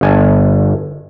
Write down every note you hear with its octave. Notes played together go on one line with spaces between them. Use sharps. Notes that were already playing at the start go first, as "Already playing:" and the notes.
G1 G#5 A5